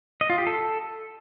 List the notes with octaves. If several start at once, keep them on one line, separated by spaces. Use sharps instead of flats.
D#5
F4
G4
A4